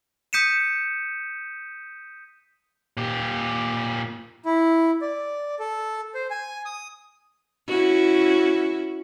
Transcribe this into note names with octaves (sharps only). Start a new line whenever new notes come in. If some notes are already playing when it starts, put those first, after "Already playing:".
D#6 G6 B6 C#7 D#7 E7
A#2 G4
E4
D5
A4
C5
G#5
D#6
C#4 E4 F#4